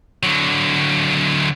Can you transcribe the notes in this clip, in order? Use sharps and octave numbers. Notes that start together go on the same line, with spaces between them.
D3 F#3